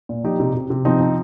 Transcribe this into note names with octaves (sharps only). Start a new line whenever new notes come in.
A#2
F3 D#4 G4
C3
C3
C3
F3 C4 D#4
F3